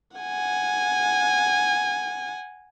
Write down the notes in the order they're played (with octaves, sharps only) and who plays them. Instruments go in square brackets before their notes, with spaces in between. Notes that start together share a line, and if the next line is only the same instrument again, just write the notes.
[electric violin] F#5 G#5